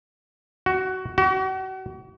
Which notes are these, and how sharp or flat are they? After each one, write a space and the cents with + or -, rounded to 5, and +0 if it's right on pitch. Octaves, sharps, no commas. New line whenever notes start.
F#4 +15
F#4 +35